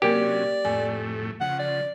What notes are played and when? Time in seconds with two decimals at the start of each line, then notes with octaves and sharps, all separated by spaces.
0.02 C3 F#3 A#3 C#4 G4 A#4 D5
0.65 F2 A2 A3 G#5
1.41 C#3 F3 F#5
1.59 D5